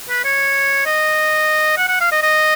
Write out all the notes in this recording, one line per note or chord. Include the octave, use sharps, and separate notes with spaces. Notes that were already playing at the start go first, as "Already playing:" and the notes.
B4
C#5
D#5
F#5
F#5
F5
D#5
D#5